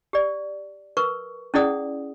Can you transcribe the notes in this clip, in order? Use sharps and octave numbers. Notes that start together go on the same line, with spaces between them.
G4 D5
A#4 B4 C#6
C#4 E4 G#4 D5 F#5 D#6